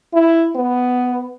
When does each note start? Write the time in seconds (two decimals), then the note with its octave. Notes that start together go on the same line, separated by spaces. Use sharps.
0.13 E4
0.55 B3